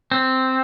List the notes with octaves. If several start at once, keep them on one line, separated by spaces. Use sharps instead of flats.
C4